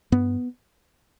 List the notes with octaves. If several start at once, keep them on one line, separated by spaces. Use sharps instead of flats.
G2 B3